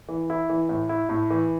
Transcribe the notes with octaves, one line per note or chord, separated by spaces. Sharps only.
E3
E4
E3
A2
E4
A2
E3